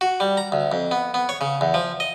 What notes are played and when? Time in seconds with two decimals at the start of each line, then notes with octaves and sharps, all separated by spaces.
0.01 F#4
0.20 G3
0.37 A#5
0.52 D2
0.72 F2
0.91 B3
1.14 B3
1.29 C#5
1.41 C#3
1.61 E2
1.74 F3
2.00 D#5